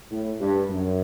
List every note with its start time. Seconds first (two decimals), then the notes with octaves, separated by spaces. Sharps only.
0.10 A2
0.40 G2
0.69 F#2